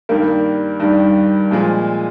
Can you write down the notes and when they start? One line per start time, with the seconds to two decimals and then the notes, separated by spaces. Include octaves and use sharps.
0.09 G2 D#3 G3 A#3
0.80 G2 D#3 G3
1.51 A#2 F3 G#3